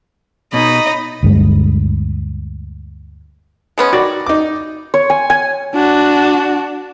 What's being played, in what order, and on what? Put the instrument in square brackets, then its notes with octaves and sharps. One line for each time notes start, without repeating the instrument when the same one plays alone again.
[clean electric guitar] B2 [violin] D#4 D#5 [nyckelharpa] B5
[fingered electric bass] D2 G2 G#3
[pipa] G#3 B3 C#4
[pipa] D#3 [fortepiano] F#4 D5
[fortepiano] D#4 D6
[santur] C#5
G#5
G#5
[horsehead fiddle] D4 F#4